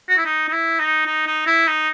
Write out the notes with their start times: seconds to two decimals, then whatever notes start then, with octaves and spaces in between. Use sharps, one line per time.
0.09 F#4
0.17 E4
0.25 D#4
0.48 D#4
0.53 E4
0.79 D#4
1.06 D#4
1.27 D#4
1.46 E4
1.67 D#4